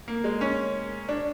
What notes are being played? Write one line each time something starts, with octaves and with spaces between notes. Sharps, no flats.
A#3
G#3
C#4
D4